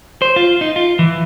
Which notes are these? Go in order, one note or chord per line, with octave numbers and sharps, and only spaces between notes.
C5
F4
D#4
F4
E3